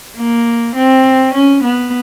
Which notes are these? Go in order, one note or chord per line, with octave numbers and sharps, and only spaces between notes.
A#3
C4
C#4
B3